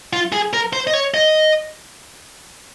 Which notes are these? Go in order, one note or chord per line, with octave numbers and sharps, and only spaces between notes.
F4
G#4
A#4
C5
D#5
C#5
D#5